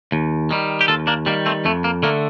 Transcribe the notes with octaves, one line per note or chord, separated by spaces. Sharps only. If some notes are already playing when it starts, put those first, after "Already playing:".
D#2
D#3 G3
G4
D#2 F4 A4
A#3 D4
D#3 G3 A#3
A3 C4
F2 A3
A#3
D3 A3 A#3